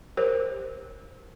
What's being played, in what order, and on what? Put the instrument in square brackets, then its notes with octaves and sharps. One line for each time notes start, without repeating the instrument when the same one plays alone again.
[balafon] G4 A#4 C5 C#5